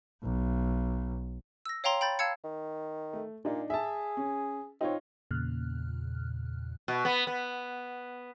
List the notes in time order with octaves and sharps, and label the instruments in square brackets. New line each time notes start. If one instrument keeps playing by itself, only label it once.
[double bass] B1
[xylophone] E6 A#6
C#5 F5 G5 A#5 C6
G5 B5 G6 A6
F5 A5 E6 G#6 C#7
[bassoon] D#3
[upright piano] A3
[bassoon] A#2 [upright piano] D4 D#4
[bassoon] G#4 [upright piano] E5 A5
[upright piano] C#4
[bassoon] C4 [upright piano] D#4 F4 C#5
[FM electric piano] E2 A#2 C#3 F6 F#6
[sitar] B2
B3
B3